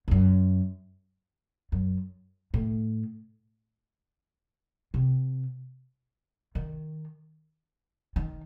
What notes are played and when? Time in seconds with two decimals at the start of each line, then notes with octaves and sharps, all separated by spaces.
0.08 G#2
0.11 F#2
1.72 F#2
2.54 A2
4.94 C3
6.55 D#3
8.16 D#3